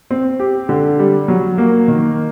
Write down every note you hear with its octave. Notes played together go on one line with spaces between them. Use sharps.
C4
G4
D3
G3
F#3
A#3
D#3